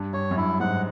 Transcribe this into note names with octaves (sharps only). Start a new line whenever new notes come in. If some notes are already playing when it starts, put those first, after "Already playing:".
Already playing: G2
G2 C#5
F#2
G2 E4
G#2 F#5